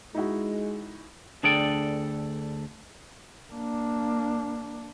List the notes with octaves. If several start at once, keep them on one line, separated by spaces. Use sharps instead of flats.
G#3 D#4 E4 F#4
D2 D4 G#4 A4 D5 G5
A#3 D4